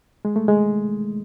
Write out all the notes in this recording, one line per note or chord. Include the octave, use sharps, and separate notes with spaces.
G#3
A3
G#3